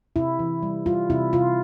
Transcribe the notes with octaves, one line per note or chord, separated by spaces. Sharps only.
C3 E4
E3
G3
G3 F4
C3 E4
C3 F4